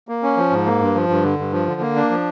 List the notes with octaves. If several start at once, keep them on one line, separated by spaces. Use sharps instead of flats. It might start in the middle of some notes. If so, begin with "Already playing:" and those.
A#3
C#4
F3
G#2
A#3
G2
F3
G2
D3
G2
F3
D3
A#3
D4
F3